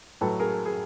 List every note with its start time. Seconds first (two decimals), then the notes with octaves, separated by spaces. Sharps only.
0.21 A2 F#3 A4 B4
0.39 G#4 A#4
0.66 G#4